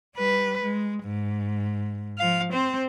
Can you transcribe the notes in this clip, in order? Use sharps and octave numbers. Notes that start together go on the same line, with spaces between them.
G3 B4
G#3
G#2
F3 F5
C4 C5